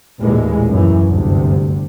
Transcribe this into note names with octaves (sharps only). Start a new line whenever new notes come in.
A1 D#2 A#2 E3 G#3
F#2 E3
G1 D2 C3